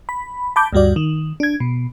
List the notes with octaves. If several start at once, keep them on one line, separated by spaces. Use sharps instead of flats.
B5
A5 B5 D6 G6
D2 G2 G3 F#4 D5
D#3
D4 G#6
B2